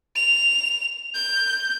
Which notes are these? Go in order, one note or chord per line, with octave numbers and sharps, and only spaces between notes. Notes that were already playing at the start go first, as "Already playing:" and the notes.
F7
G6